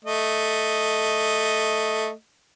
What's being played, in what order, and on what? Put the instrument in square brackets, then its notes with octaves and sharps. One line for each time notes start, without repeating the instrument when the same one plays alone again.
[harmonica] A3 D#5